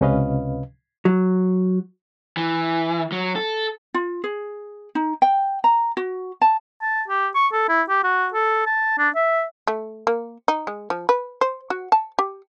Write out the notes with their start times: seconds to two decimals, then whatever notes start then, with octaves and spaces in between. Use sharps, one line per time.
0.01 C#2 C3 C#4 B4 D#5 F5
1.05 F#3
2.37 E3
3.12 F#3
3.36 A4
3.94 F4
4.24 G#4
4.95 D#4
5.22 G5
5.64 A#5
5.97 F#4
6.42 A5
6.82 A5
7.08 G4
7.35 C#6
7.52 A4
7.69 E4
7.89 G4
8.03 F#4
8.34 A4
8.66 A5
8.98 D4
9.15 E5
9.67 A3
10.07 A#3
10.48 D#4
10.67 G#3
10.90 F3
11.09 B4
11.41 C5
11.70 F#4
11.92 A5
12.19 G4